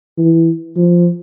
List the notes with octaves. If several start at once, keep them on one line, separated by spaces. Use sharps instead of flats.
E3
F3